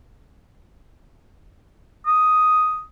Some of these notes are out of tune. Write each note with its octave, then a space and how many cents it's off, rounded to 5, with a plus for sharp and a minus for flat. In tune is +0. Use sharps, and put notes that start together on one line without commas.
D#6 +5